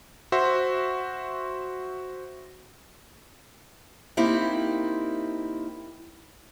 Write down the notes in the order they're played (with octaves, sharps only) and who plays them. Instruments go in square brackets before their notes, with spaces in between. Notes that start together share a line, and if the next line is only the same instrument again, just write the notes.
[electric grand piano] F#4 C5 E5
[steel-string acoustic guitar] A#3 C4 D#4 E4 G4